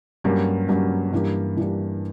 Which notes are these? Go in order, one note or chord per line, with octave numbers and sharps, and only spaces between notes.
G2 F#3 A#3 C#4 G4
G2 F#3 A#3 C#4 G4
G2 E3 A#3 D4 G4
G2 E3 A#3 D4 G4